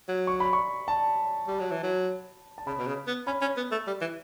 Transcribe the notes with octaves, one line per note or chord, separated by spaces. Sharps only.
F#3
C#6
B5
C#6
A5
G3
F#3
E3
F#3
A5
C#3 B5
B2
C#3
B3
C#4 B5
C#4
B3
A3
G3
E3